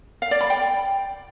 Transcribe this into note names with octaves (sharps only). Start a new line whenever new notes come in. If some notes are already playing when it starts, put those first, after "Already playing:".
F5
D5
B5
G5